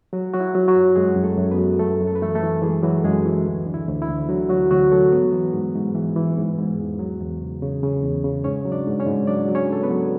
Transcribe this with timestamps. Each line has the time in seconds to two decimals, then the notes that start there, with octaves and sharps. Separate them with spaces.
0.13 F#3 F#4
0.33 F#3 F#4
0.40 E4
0.55 F#3
0.68 F#3 F#4
0.76 F#2
0.96 F#2 G#3 G#4
1.16 F#2
1.23 A3 A4
1.37 F#2
1.51 B3 B4
1.58 F#3
1.79 F#2 A3 A4
2.01 F#2
2.07 A4
2.15 B4
2.21 E3 A3 A4
2.35 A3 A4
2.42 E3
2.62 E3 G#3 G#4
2.83 E3 F#3 F#4
3.04 F#2 G#3 G#4
3.25 E3 E4
3.46 D2
3.67 D3
3.74 E4
3.88 D2
4.02 E4
4.08 D2
4.29 D3 F#3 F#4
4.49 D2 F#3 F#4
4.71 D2 F#3 F#4
4.91 F#3 A3 A4
5.12 G#2 B3 B4
5.32 E3
5.53 G#2
5.75 G#2
5.95 E3
6.16 E3
6.37 G#2
6.58 G#2
6.78 E2
6.99 F#3
7.20 E2
7.41 C#3
7.62 C#3
7.83 C#3
8.03 E2
8.24 C#3
8.44 G#2 C#4 C#5
8.65 F#3
8.72 D4 D5
8.87 G#2
9.00 C#4 C#5
9.07 G#2
9.27 F#3 D4 D5
9.48 F#3
9.55 C#4 C#5
9.69 G#2 A4
9.83 B3 B4
9.90 F#3